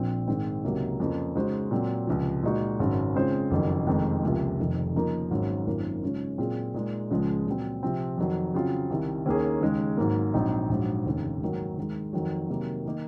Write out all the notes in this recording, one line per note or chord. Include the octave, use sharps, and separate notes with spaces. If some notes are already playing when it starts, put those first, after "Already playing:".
Already playing: A#1 A#2 F3 C4
G#2 D#3 G#3 C4
C#2 C3 F#3 A#3 D#4
F2 C#3 F3 A#3
C#3 G#3 D#4 F#4 C5
A#2 F#3 C4
C#2 C3 F3
A#2 G#3 D#4 F#4
G#1 F#2 C#3 F#3
C#3 G#3 C4 F4 C5
F#1 F2 D#3 F#3
F1 F2 D#3 G#3 C4
C#2 C3 F3 A#3 F4
F1 F2 D#3
C#3 F3 A#3 D#4 A#4
G#1 G#2 F#3 A#3 C#4
G#1 F#2 D#3 A#3 F4
C#3 G#3 C#4 F4
A#2 F#3 C4 F4 G#4
A#2 G#3 D#4
C#2 C#3 F3 G#3 C#4
A#2 F#3 C4
C3 F3 C4
F2 D#3 F#3
C#3 F#3 C4 F4
C2 C3 D#3
D#2 D#3 A#3 C#4 G#4
D#2 C#3 G#3
G#1 G#2 F#3 A#3
A#1 G#2 F#3 C4 D#4
A#1 G#2 F#3
F1 D#2 C#3
G#1 G#2 D#3 F#3 A#3
D#2 D#3 G#3
F2 D#3 F#3
C3 D#3 F#3 A#3
D#3 A#3 D#4